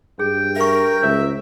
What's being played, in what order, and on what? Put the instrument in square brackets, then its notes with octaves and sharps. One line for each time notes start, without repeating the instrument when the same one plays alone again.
[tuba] G2 [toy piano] G#4 [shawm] G5
[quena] A#4 [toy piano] E5 C#6
[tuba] C#2 [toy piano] C5 [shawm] E5